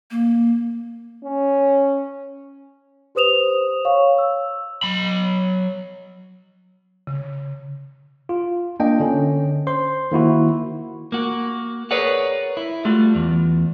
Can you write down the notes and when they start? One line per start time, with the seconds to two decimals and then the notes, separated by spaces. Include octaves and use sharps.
0.11 A#3
1.24 C#4
3.15 G4 B4 C5 D#6 E7 F7
3.85 C#5 F5 C#6
4.18 E6
4.83 F#3 B5
7.07 C#3
8.29 F4
8.80 A#3 D4 D#5 G5
9.00 D3 C#4
9.67 C5 C6
10.12 D#3 A#3 E4 F#4
11.12 A#3 F#4
11.91 G#4 A#4 B4 C#5 D5 F#5
12.57 E4
12.85 G3 A3 F4 F#4
13.15 E2